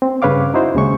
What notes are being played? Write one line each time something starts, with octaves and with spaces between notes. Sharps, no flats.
C4
G2 C#3 B4 C#5 F5 D6
D#4 E4 F#4 C5
D#2 C#3 G#3 C#6